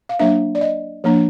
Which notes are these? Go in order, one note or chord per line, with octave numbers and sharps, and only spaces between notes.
F5
F#3 A#3 D4 E5
D5
D#5
F3 A#3 D4